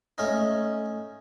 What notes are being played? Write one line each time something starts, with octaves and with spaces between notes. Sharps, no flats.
A3 C#4 D#4